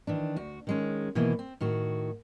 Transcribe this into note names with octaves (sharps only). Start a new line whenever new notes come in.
D#3 E3 D4
D2 F#4
D#3 G#3 C#4
B2 D#3 E3 A#3 E4
C4
A2 D#3 F#4